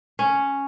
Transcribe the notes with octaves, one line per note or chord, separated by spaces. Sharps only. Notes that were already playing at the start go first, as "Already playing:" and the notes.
C#4